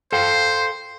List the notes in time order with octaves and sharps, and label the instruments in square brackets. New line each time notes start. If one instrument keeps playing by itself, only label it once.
[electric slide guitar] A4 F5 G5 [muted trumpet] C5 [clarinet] C6